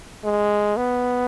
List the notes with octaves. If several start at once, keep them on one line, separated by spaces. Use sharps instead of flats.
G#3
B3